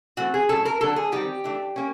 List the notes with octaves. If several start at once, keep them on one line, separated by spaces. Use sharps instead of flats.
E3 A3 C4 F#4
G#4
A2 F#3 A3 C#4 A4
A#4
D3 F#3 A#3 D4 A4
G#4
D#3 G3 C4 G4
E3 A3 D4
A#3 C#4